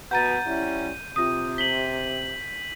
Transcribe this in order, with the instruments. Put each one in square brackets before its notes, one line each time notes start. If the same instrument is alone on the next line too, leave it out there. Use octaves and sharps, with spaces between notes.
[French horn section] B2 [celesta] F#5 A#5 A6 [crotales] G6 D#7
[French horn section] G3 C#4 E4
[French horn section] C3 [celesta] F4 D#6 [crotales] D#7
[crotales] B6 F#7 [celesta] G7